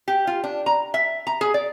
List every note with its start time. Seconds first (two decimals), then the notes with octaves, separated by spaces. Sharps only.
0.08 G4
0.27 F4
0.44 D4
0.66 A#5
0.94 E5
1.27 A#5
1.41 G#4
1.54 D5